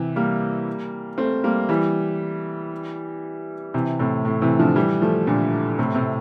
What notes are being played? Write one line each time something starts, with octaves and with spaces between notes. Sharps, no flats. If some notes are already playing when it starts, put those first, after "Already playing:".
Already playing: C3 E3
G3 A#3
A3 C4
G3 A#3
E3 G3
C3 E3
A2 C3
A2
C3 E3
D3 F3
E3 G3
F3 A3
A#2 D3
A2 C3
A2 C3